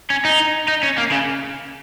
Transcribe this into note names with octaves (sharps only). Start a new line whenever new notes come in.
C#4
D#4
D#4
C#4
A#3
C#3